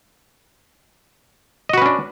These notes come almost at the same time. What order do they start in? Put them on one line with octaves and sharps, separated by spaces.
D#5 F#4 B4 C#4 D4